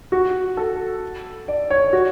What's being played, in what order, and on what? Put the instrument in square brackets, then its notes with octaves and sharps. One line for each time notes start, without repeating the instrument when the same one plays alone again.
[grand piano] F#4
A4
D5
C#5
F#4